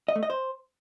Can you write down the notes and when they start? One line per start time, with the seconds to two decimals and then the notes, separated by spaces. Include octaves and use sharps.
0.08 D#5
0.16 A3
0.23 D#5
0.30 C5